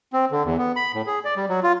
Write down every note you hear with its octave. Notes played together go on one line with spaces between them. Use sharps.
C4
D3
E2
B3
B5
A2
G#4
D5
G3
F#3
F4